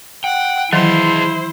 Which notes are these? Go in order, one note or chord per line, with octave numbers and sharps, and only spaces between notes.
F#5 G5
D#3 E3 F#3 E4 G#4 C5 D#5 F5